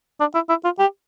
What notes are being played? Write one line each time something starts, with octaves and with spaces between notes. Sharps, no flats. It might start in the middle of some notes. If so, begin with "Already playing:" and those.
D4
E4
E4
F4
G4